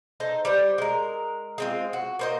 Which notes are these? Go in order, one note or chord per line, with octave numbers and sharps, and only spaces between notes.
D#4 A4 C5
G3 C5
G#3 A#4
G#3 C4 F4
F#4
A#3 C5 D#5